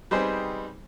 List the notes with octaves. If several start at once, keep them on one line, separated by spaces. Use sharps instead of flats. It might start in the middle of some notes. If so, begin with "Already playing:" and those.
G3 B3 C4 D#4 G#4 C5